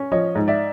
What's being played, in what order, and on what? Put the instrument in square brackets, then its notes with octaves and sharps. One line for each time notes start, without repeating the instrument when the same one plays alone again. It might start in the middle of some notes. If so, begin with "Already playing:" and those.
Already playing: [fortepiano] C#4
[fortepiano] F3 [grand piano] C#5 D#5
[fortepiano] G#2
[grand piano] D5 E5